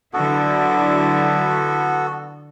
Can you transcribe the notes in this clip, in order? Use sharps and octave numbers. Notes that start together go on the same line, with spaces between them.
D3 F#3 B3 E4 F#4 A4